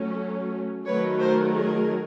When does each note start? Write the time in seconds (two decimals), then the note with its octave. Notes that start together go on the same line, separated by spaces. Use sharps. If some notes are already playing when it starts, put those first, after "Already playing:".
Already playing: F#3 A3 C#4
0.86 D#3 F#3 A3 B4 C#5
1.19 A#4 C5
1.52 G#4 A#4